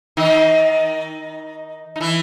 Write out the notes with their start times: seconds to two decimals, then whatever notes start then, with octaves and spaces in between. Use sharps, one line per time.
0.17 D#3 D#4
1.96 D#4
2.01 E3 E4